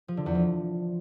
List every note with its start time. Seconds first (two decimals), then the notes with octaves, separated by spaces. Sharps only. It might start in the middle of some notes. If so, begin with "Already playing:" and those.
0.08 F3
0.17 D3
0.26 E2
0.35 F3